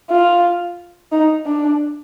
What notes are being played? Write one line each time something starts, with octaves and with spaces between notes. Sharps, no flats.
F4
D#4
D4